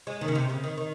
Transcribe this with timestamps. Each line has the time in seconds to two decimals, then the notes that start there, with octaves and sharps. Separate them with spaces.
0.07 G#3
0.21 D#3
0.28 C#3
0.35 C3
0.49 C#3
0.64 D#3
0.77 D#3